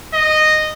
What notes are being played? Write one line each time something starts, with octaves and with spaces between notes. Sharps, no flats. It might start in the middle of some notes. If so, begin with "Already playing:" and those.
D#5